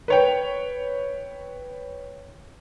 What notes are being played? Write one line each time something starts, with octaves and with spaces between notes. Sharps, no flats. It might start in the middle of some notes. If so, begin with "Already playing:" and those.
B4 C#5 G5